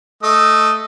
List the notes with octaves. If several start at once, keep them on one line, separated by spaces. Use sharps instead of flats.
A3 D#5 D#6